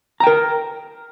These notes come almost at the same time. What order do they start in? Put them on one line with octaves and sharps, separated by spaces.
A#5 G5 A#4